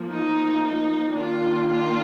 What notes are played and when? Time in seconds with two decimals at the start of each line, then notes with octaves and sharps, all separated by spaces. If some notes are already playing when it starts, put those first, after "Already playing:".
Already playing: F3 A#3
0.11 D#4
0.65 D#4
1.19 D#3 A#3 D4 F4
1.73 F4